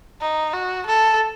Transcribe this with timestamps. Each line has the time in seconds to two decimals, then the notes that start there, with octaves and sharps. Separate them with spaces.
0.21 D#4
0.53 F#4
0.86 A4